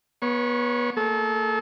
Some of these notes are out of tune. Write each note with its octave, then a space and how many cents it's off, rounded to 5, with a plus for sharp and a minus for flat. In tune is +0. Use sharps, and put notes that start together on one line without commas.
B3 -25 C#5 +5 C#6 -35
A#3 -45 A4 -35